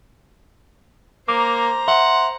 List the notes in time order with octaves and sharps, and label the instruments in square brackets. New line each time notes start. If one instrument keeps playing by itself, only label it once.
[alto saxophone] A#3 [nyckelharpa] C5 A#5 [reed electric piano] D6
[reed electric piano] E5 [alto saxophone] F#5 [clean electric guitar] C6